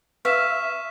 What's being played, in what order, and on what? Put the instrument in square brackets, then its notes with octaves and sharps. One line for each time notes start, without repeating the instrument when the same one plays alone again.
[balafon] B4 [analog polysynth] E5 [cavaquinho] F5 [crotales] C#6 B6 E7